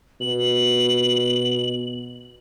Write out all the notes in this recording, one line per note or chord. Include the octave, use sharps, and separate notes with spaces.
B2 F#7